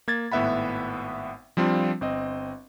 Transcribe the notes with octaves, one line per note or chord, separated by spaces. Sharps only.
A#3 G#6 A6
G#1 A2 B3 E5 F#5 B5
F3 G3 C4 D4 F4
G1 C4 D#5